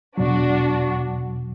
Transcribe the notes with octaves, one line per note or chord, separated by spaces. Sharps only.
E2 B2 F#3 D4 F#4